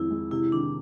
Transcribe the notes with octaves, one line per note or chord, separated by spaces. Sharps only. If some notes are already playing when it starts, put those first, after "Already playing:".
Already playing: F2 D#3 G#3 E4
G#3
C3 E4
D#3 D4